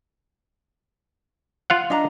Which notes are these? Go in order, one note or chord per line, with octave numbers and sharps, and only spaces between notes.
F4 F5 F#5
D4 D#5 A#5